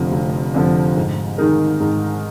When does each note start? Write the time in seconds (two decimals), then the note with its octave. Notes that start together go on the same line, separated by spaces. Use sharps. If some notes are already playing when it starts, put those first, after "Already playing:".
Already playing: F1 F2 D3 F3
0.12 F1
0.54 F2 D3 F3
0.96 G#2
1.38 D#3 G#3 D#4 A#4
1.80 G#2